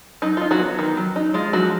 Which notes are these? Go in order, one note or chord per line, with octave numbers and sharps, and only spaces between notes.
F#3 D#4
D#4 F4
F#3 F#4
B3
D#3
F#3
D#4
G#3 F4
F3 F#3 F#4